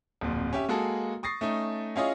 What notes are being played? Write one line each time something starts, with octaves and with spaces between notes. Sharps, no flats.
D1 F2 A#2
C#4 G4 E5
G#3 A#3 F#4 G#4 A4
C#6 D#6 A6 A#6 C7
A3 C#4 D#4
C#4 E4 F4 G#4 C#5 D#5